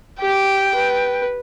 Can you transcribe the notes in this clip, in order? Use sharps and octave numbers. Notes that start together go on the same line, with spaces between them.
G4 G5
B4